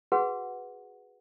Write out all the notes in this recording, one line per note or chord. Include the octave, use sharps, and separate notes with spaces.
F#4 G#4 B4 F#5